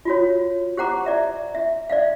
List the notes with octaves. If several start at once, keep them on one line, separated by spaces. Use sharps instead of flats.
F4 F#4 C#5
G4 C5 F#5 A#5 D6
D5 E5 A#5
E5
D5 E5 F5